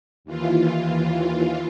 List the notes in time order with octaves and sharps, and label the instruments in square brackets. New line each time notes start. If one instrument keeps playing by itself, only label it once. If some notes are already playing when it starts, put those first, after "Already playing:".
[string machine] D#2 E3 F4